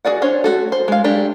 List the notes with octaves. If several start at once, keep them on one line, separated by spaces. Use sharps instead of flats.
F#4 G#4 D5 F#5
C#4 D4 C5 C#5
A3 F#4 A4
C5
G#3 F5
G#3 A3 D4 G4